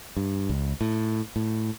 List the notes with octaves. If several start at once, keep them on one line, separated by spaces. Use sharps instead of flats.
G2
C#2
A2
A2